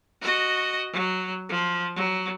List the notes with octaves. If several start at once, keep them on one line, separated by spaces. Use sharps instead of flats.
F#4 D#5
F#3
F3
F#3